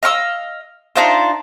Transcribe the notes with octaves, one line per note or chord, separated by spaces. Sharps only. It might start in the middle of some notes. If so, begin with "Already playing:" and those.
D#5 F5 C#6 E6
D4 D#4 F4 C5